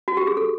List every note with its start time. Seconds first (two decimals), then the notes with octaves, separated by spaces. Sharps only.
0.08 F#4
0.17 G4
0.27 G#4
0.37 A4